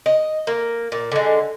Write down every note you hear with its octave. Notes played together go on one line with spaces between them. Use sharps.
D#5
A#3
A#2
D3 G#3